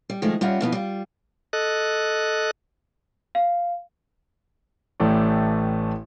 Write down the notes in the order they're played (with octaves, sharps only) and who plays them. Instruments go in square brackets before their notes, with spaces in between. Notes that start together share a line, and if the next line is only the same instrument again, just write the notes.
[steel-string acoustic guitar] G3
D#3 F3 G#3 A3
G3 C#4 F4 A#4 E5 F#5
B2 F3 B3 E4
G3 F4
[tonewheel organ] A4 D#5 F#6
[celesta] F5
[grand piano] A1 A2 E3 A3 D5